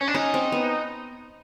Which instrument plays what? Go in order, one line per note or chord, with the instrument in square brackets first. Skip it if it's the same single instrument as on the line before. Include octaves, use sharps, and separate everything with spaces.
[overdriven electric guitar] C#4
D4
[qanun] C#4 [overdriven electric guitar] D#4
[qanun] C4
B3